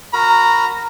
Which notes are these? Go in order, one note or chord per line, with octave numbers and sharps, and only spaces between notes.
F#4 A#4 A#5 B5